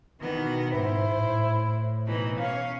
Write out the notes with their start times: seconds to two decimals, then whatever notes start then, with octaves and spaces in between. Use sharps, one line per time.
0.20 B2 D#3 E3 B3
0.74 G#2 E4 C5
1.17 A2
2.05 B2 E3 D#4
2.39 C#4 C#5 F5